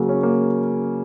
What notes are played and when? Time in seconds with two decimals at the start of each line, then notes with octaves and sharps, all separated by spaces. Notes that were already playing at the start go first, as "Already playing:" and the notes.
Already playing: C#3 F#3 A#3
0.09 C#4
0.23 A#3